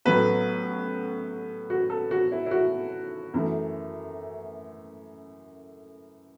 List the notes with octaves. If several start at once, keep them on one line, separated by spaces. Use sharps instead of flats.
A1 A2 F#3 B3 B4
F#4
A4
F#4
E4
E4
F#4
F#2 E3 A3